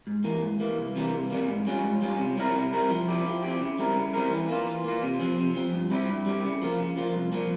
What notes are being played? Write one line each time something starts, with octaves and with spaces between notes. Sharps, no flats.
G#2
E3 A#3
G#2
E3 A#3
C2
C3 E3 G3 A#3
C2
C3 E3 G3 A#3
G#2
G3 C#4 F4
G#2
G3 C#4 F4
C3
G3 C4 E4 A#4
C3
G3 C4 E4 A#4
F3
C4 E4 G4
F3
C4 E4 G4
C#3
G3 C4 E4 A#4
C#3
G3 C4 E4 A#4
E3
A#3 F4
E3
A#3 F4
C3
F3 C4
C3
F3 C4
G2
G3 C4 E4 G4
G2
G3 C4 E4 G4
C#3
F3 A#3 F4
C#3
F3 A#3 F4
C2
A#2 F3 A#3